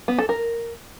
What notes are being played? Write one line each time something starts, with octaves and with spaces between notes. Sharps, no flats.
B3
A4
A#4